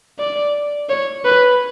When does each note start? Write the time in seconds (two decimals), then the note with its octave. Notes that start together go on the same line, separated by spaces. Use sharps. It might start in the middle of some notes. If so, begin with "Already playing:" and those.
0.19 D5
0.90 C#5
1.25 B4